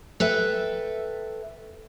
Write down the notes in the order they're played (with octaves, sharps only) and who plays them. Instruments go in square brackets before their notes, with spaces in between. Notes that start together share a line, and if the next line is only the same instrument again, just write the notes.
[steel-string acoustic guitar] A4 B4 E5 G5